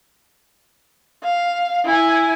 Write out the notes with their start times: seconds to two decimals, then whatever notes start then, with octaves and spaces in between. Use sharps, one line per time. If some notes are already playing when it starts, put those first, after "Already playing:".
1.24 F5
1.85 E4 G#5